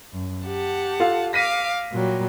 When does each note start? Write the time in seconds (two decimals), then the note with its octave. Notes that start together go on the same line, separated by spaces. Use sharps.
0.13 F#2
0.46 G4 F#5 A5
1.00 F4 A4 F5
1.33 F5 D6 A#6 B6 D#7
1.92 A#2 F#3 G3